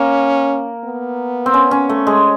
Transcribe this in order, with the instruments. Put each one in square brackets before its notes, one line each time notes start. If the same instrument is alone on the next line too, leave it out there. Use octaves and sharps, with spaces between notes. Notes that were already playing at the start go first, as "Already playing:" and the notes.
Already playing: [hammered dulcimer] A#3 [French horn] C#4
[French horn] B3
[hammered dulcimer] C4
C#4
C#4
A3
G#3